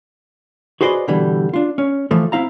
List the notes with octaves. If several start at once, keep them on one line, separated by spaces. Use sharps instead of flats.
F#4 G#4 B4 C5 D5 D#5
B2 D3 E3 G3
D4 F4
C#4
E3 F3 A3
C4 E4 F5 A#5